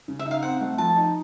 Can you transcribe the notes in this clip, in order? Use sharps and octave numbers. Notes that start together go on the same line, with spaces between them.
C#3
E5
D#4
F5
C4 F#5
A3
F3 A5
D#4